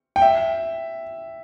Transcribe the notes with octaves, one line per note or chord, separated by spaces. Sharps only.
G5
E5